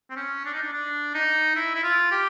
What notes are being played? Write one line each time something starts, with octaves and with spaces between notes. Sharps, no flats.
C4
C#4
D4
D#4
D4
D4
D#4
E4
E4
F4
G4